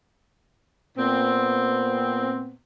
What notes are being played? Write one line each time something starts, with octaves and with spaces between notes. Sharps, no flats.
A#2 B3 C4